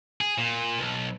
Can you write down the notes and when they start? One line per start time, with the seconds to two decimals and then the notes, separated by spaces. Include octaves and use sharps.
0.21 G#4
0.38 A#2
0.79 B1